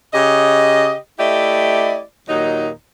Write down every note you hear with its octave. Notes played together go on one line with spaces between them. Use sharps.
C#3 G4 D#5
A3 E4 G4 D5 D#5
D#2 A#2 F#3 D#4